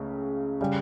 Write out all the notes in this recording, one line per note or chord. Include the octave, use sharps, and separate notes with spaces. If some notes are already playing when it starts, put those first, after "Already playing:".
Already playing: C#2 C#3 A3
C#3 G3